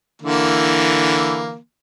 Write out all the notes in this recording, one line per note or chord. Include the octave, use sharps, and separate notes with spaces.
D3 E3 A#3